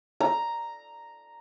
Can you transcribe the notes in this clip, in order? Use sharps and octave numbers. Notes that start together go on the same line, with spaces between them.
A#5